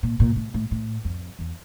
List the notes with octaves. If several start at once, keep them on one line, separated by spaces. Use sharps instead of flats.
A#2
A#2
A2
A2
A2
F2
E2